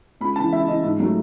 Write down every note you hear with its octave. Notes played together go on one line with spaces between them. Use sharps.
C#2 B5
C#3 E3 A5
C#2 E5
C#3 E3 D#5
G#2
F#3 A3